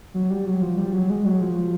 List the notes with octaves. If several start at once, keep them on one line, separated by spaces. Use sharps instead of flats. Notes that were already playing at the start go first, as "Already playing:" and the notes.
F#3
G3
F#3
F3
G3
F#3
G#3
F#3
F3